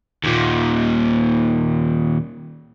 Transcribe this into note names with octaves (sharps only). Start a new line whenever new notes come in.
D#2 A#2